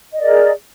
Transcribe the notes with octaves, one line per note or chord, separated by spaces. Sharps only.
G#4 A#4 D5 D#5